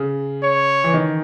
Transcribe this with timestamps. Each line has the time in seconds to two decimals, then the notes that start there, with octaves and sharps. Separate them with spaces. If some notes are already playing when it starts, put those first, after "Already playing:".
Already playing: C#3
0.43 C#5
0.84 E3
0.94 D#3